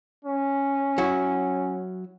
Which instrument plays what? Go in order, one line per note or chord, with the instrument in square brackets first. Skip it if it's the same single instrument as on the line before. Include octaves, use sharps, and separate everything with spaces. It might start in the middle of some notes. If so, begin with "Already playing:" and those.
[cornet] C#4
[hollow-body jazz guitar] F#3 E4 F#4